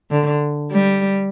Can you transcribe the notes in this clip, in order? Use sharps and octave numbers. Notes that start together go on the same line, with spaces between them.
D3
G3